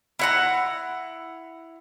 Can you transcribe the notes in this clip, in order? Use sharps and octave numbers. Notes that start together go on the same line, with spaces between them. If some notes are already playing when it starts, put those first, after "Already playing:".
E4 F#5 A#5